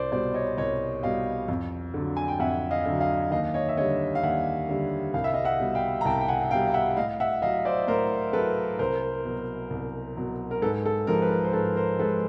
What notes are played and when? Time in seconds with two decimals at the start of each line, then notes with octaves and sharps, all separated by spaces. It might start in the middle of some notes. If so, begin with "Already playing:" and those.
Already playing: C2 C5 D5
0.12 B2 G3 C5 D5
0.34 C#5 D#5
0.57 C2 C#5 D#5
1.03 B2 G3 D#5 F5
1.48 F2
1.94 D3 F#3
2.17 G#5
2.28 G5
2.40 F2 E5 F#5
2.71 D#5 F5
2.85 D3 F#3
3.01 D#5 F5
3.31 D#2 D#5 F5
3.54 C#5 D#5
3.69 E5
3.77 D3 G3 C#5 D#5
4.15 F5
4.23 D#2 E5 F#5
4.69 D3 G3
5.14 C2 F5
5.24 E5
5.34 D#5 F5
5.44 E5 F#5
5.60 B2 G3
5.75 F5 G5
6.01 A#5
6.05 C2 G5 A5
6.21 G5
6.28 F#5 G#5
6.51 B2 G3 F5 G5
6.67 F5
6.74 E5 F#5
6.96 A2 D#5 F5
7.20 E5 F#5
7.42 F#3 D#5 F5
7.65 C5 D5
7.88 A2 A#4 C5
8.33 F#3 A4 B4
8.79 C2 A#4 C5
9.25 B2 F#3
9.70 C2
10.17 B2 F#3
10.51 A#4
10.62 G#2 A4 B4
10.86 A4
11.07 F3 G#3 A#4
11.22 B4
11.31 A#4
11.44 C5
11.53 G#2 A4 B4
11.76 A#4 C5
11.99 F3 G#3 A4 B4